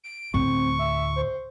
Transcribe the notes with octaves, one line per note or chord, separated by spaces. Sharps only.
D7
D2 A2 C4 C#6
E5
C5